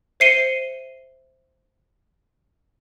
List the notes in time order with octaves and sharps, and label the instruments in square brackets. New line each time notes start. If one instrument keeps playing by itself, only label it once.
[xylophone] C5 E5 C7 C#7 D#7 G7